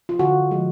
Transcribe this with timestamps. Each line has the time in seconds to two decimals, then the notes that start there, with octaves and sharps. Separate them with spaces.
0.09 F4
0.19 D3 F#4
0.51 F3 G#3